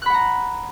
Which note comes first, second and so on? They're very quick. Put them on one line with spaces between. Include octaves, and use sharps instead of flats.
F#6 B5 F#5 A#5